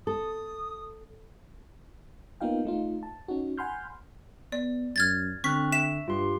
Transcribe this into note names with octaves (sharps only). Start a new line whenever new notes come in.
A4 D#6
A#3 B3 D#4 F4 F5 G5
A3 D#4 F4
A5
C#4 D#4 F#4
F#5 G#5 B5 C6 F6 G6
B3 D5
F#2 F6 G#6 A6
D3 C4 C#6 F6 F#6 B6
E5 B6 E7
G2 F4 G4 C6